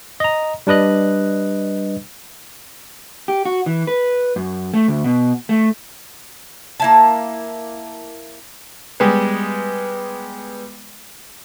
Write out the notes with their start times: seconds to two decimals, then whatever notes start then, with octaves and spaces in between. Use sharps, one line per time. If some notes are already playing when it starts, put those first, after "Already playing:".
0.20 D#5 A#5
0.67 G3 D4 B4 D#5 F#6
3.28 G4
3.45 F#4
3.66 E3
3.87 B4
4.36 F#2
4.74 A3
4.88 D2
5.04 B2
5.49 A3
6.80 A#3 E4 A5
9.00 G3 G#3 B3